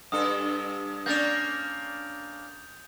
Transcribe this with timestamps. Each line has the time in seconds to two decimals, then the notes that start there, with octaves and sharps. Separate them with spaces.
0.12 G2 A4 D#6
1.06 A#3 C#4 D4 G6 A6 F7